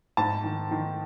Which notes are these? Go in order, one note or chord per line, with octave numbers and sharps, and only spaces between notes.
G#2 A5
D#3
D#3